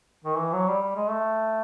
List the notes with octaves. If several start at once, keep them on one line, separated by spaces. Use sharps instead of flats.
D#3
E3
F#3
G3
G3
G#3
A3